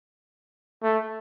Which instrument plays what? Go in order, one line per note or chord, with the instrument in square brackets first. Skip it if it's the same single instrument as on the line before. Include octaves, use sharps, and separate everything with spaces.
[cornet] A3